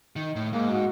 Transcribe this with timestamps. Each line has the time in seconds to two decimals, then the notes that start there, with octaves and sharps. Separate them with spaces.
0.16 D#3
0.36 A2
0.53 G#2 A#3
0.70 F#4